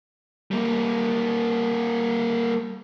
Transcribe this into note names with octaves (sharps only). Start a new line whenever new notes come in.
G3 A#3